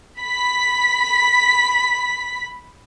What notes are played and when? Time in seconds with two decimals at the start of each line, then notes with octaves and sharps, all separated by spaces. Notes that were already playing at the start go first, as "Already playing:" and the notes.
0.19 B5 B6